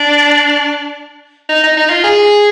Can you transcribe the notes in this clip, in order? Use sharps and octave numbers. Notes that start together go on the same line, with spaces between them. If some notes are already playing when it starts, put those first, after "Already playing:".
Already playing: D4
D#4
D#4
D#4
F4
G#4